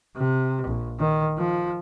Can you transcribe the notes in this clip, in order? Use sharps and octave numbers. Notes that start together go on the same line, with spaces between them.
C3
A#1
D#3
F3